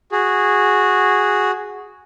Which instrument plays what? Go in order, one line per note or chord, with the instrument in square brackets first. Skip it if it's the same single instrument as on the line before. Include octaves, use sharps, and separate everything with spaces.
[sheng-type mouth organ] F#4 G#4